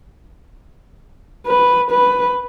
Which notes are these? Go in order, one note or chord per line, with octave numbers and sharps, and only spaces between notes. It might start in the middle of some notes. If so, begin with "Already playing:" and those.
B4
B4